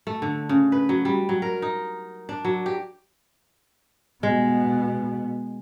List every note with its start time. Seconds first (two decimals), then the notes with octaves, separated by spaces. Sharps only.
0.07 A3
0.22 D3
0.49 C#3
0.72 B4
0.89 F#3
1.05 G3
1.29 F#3
1.42 A#4
1.62 D#4
2.29 D4
2.45 F#3
2.66 G4
4.23 B2 G#3 B3